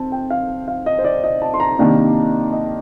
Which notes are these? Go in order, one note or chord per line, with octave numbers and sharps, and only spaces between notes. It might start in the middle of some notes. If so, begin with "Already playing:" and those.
Already playing: C4 A5
G5
F5
F5
D#5
C5
D5
D#5
A5
C6
A#5
C3 D#3 A#3 D4
D#5